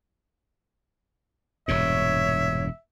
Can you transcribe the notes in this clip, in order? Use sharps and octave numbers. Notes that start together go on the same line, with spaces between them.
E1 G2 A#2 C#5 E5 G#6